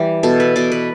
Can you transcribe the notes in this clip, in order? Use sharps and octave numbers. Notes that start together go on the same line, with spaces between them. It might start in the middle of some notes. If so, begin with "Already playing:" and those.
Already playing: E3 G3 G4
B2 A4
B4
B2 D5
B4